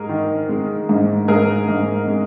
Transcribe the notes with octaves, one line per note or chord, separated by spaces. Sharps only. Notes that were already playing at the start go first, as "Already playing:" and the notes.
Already playing: G#2 G#4 A#4
D#3
G#3
G#2
G#2 G#4 A#4
G#2
G#3